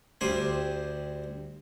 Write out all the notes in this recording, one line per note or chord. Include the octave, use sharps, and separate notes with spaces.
D2 G3 D4 G4 C5 G#5